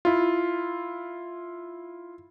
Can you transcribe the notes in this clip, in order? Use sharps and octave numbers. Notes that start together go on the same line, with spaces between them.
E4 F4